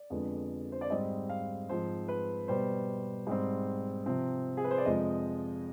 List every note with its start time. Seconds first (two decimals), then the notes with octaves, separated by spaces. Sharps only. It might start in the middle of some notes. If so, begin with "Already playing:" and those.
Already playing: D5
0.10 F2 D3 G#3 B3
0.72 C5
0.81 D5
0.90 G#2 G3 C4 D#5
1.29 F5
1.69 G#2 F3 C4 C5
2.08 B4
2.48 B2 G3 B3 C5
3.27 G#2 G3 C4
4.06 C3 F3 C4
4.57 G#4
4.64 B4
4.71 C5
4.78 D5
4.85 F2 C3 F3 G#3 D#5